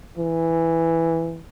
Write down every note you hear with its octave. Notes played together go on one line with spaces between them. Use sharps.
E3